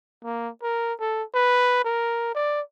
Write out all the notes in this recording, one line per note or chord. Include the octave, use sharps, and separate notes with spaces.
A#3
A#4
A4
B4
A#4
D5